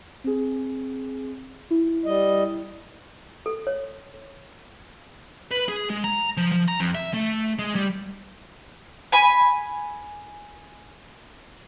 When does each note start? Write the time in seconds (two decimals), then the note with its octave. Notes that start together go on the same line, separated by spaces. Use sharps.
0.24 C4 G#4
1.71 E4
2.05 G3 D#5
3.46 A4
3.67 C#5
5.51 B4
5.68 G#4
5.90 G#3
6.04 A#5
6.37 F3
6.52 F3
6.68 A#5
6.80 F2
6.95 E5
7.14 A3
7.59 G#3
7.75 G3
9.12 G#5 B5